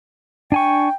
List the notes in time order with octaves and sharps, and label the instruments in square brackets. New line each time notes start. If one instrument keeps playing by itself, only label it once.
[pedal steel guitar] D4 G#5 C#6 [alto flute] G5